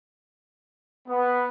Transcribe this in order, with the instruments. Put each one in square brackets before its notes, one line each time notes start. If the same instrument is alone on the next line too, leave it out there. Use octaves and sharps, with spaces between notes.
[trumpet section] B3